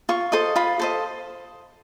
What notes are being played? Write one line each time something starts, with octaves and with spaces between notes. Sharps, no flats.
F4 C#6
A4 C5 D#5 C6
F4 B5
A4 C5 D#5